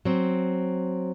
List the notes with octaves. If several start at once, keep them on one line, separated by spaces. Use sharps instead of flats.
F#3 C4